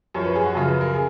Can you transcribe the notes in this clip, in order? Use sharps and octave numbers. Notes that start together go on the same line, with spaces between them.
F#2 F3 C#5
B4
G#4
F#4
F#2 C#3 F3
B4
A#4
G#4